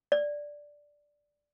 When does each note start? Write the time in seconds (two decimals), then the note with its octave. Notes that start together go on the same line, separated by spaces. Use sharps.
0.12 D5